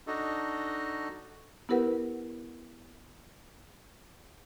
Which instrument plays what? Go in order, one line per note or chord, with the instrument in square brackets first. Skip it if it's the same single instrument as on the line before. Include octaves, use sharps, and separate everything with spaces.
[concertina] D4 D#4 F#4 A4 D#5
[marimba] B3 E4 G4 A#4 B4 F#5